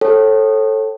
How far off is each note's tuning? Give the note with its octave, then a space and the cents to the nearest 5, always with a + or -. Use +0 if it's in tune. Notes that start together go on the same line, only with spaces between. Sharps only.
A4 +0 C#5 -35 G5 -25